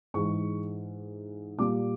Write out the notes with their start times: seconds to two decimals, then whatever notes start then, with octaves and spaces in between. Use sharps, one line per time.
0.14 G#2 E3 G#3 C#6
1.58 A#2 G3 A#3 D6